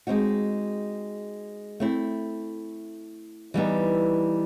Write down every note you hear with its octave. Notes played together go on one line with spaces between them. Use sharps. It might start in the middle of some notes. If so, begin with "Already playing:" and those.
G#3 C4 D#4 F#4
A3 C4 E4
E3 G3 B3 D#4